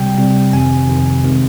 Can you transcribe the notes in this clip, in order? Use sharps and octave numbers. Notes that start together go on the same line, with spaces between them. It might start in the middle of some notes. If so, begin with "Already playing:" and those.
Already playing: C3 G3 G5
C3 G3
F2 C3 D#3 G#5
F2 C3 D#3
C3 D#3 G#3